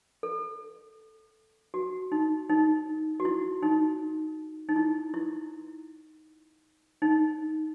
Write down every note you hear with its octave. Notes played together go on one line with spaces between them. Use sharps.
A4
F#4
D#4
D#4
F#4
E4
D#4
D#4
E4
E4
D#4